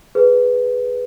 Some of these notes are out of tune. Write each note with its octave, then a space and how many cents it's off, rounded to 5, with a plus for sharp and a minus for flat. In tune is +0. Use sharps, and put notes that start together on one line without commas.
G#4 +0 B4 +0